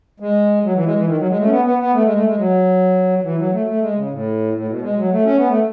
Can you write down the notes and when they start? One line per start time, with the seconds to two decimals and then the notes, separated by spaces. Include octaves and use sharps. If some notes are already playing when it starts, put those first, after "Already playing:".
0.20 G#3
0.64 F#3
0.75 E3
0.85 G#3
0.96 E3
1.07 D#3
1.18 F#3
1.28 G#3
1.39 A3
1.45 C#4
1.50 B3
1.65 B3
1.79 B3
1.93 A3
2.04 G#3
2.15 A3
2.26 G#3
2.37 F#3
3.23 E3
3.38 F#3
3.52 A3
3.67 A3
3.81 G#3
3.95 C#3
4.10 A2
4.54 A2
4.68 B2
4.82 G#3
4.97 F#3
5.11 A3
5.25 C#4
5.37 B3
5.48 A3